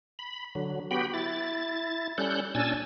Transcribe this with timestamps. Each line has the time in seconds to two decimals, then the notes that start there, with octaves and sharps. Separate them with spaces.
0.19 B5
0.55 D3 F#3
0.91 B3 F#4 G4 G5 B5
1.14 E4 A6
2.18 G3 C#4 A4 F#6 G6
2.55 A#2 C#4 D4 G#5 E6 A6